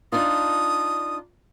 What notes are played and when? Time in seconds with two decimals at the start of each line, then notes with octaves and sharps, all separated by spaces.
0.12 D4 D#4 F4 D#6